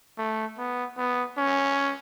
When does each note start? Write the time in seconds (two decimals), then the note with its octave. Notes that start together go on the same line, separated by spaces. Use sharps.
0.18 A3
0.58 B3
0.97 B3
1.38 C#4